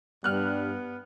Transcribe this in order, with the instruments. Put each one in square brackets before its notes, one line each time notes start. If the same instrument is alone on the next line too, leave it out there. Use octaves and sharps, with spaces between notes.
[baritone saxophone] G2 [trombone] G3 [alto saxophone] B3 [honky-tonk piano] F6 F#6